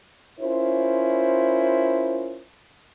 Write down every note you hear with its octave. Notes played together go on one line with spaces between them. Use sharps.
C#4 E4 F4 A#4 C5